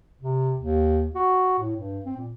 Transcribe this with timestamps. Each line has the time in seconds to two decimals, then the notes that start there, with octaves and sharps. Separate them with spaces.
0.21 C3
0.57 D#2
1.15 F#4
1.59 A2
1.76 G2
2.05 C4
2.17 A#2